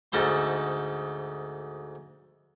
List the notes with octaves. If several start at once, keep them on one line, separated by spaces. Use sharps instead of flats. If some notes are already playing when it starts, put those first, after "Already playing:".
D2 G#2 A4 C5 C6